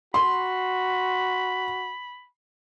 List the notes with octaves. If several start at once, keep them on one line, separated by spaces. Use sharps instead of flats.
F#4 B5 C6